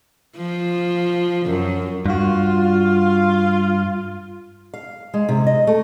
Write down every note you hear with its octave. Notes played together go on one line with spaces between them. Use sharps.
F3
F#2
G2 F4 F#4
F5
G#3
C3
D#5
A3